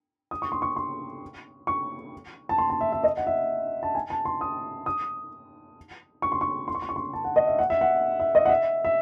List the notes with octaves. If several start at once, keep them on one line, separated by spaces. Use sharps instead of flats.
D#6
C#6
C6
C#6
C6
C#6
A5
C6
A5
E5
E5
D#5
F#5
E5
A5
G#5
A5
C6
D#6
D#6
C#6
C6
C#6
C6
C#6
C6
C#6
C6
A5
F#5
D#5
E5
F#5
E5
F#5
E5
D#5
F#5
E5
E5